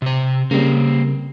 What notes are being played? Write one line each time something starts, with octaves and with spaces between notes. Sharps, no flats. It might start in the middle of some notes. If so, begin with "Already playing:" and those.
C3 C5
C#3 G3 A#3 C4